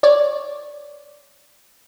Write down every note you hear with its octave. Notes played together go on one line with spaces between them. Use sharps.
C#5 D5